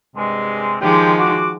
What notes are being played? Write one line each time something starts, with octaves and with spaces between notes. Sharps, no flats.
G2 C3 G#3
D#3 F3 G#3 G4
F#4 D6